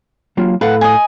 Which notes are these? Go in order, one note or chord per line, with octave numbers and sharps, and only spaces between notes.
F#3 A#3 F4
A2 A4 B4 F5 F#5
D#5 G#5